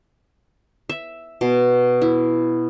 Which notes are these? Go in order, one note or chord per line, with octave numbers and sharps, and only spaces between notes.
E5
B2
E4